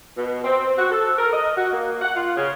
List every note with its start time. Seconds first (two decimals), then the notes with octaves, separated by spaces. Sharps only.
0.16 B2
0.44 C4
0.78 F#4
0.92 A4
1.18 A#4
1.33 D#5
1.57 F#4
1.72 A#3
2.02 F#5
2.16 F4
2.37 C#3